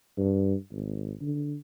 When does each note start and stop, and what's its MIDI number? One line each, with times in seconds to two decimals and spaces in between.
0.18 0.55 43
0.71 1.12 32
1.21 1.56 50